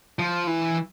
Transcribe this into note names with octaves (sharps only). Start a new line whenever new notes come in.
F3
E3